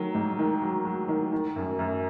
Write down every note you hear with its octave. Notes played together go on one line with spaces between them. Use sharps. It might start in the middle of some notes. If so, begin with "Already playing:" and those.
Already playing: D#3 F#3
G#2
D#3
F#3
F#3
D#3
D#3
F#2
F#2